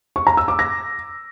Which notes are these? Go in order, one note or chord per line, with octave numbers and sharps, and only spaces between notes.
C#6
A#5
E6
D6
A#6